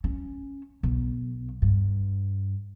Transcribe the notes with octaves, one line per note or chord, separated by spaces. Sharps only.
C#4
B1
G2